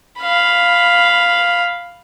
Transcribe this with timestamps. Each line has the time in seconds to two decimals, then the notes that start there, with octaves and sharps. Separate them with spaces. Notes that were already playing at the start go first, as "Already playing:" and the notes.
0.19 F5 B5